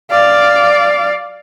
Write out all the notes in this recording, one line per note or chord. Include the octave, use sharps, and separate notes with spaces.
D5 F5